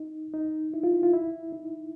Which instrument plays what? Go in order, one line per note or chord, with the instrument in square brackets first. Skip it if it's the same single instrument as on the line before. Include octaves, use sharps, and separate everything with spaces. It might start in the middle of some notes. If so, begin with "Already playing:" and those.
Already playing: [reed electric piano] D#4
D#4
E4
F4
E4
F4
E4
D#4